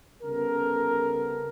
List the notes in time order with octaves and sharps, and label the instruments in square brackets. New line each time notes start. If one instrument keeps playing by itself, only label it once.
[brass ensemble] C2 C#3 B3 A4 A#4